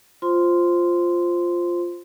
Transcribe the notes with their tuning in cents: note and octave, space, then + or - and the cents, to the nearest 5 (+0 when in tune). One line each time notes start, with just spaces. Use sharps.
F4 +0 C5 +0 C6 -10